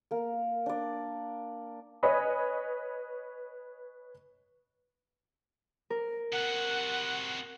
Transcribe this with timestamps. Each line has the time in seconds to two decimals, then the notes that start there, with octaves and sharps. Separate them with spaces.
0.11 A#3 A#4
0.66 D4 D5
2.03 B4 C#5 D#5 G#5 B5 D#6
5.90 A#4
6.32 C3 F#4 F#5